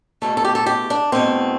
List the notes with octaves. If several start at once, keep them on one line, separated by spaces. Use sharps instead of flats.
E2 B2 A3 A4
A4
G4
A4
G4
D4
E2 B2 A3 C4